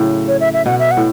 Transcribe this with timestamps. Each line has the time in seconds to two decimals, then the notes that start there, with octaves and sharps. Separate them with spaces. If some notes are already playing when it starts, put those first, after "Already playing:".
Already playing: A2 C#3 F#3
0.28 C#5
0.40 E5
0.54 E5
0.66 B2 F#5
0.79 E5
0.91 F#5
0.97 A2